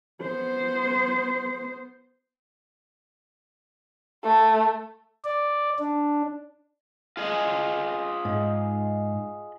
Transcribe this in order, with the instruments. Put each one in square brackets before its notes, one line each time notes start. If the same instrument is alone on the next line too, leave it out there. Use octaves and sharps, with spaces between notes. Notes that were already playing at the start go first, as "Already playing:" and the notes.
[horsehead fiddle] B3 C5
[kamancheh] A3
[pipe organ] D5
D4
[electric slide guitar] F4 G#4 D#5
[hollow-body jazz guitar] G#2